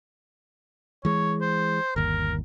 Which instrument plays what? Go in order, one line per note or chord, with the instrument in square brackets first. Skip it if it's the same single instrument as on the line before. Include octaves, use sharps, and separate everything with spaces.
[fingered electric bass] E3 G#3 [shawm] C#5
[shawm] C5
[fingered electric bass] G1 D#2 [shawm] A#4